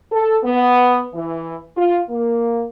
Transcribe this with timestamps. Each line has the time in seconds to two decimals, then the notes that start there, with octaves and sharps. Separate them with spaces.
0.12 A4
0.43 B3
1.13 E3
1.76 F4
2.10 A#3